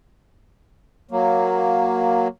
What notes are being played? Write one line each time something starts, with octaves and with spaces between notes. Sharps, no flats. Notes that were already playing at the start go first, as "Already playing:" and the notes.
F#3 A#3